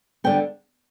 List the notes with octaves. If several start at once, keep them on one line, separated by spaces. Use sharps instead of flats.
D3 G3 B3 G5